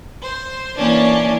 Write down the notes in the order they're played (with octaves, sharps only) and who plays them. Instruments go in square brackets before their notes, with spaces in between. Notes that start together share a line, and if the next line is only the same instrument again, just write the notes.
[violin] C5
[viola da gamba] E3 A#3 [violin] C#4 D4